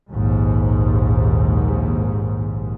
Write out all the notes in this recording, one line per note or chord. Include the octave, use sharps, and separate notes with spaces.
A#1 D#2 G#2